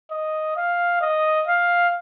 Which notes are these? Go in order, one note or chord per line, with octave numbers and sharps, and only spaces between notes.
D#5
F5
D#5
F5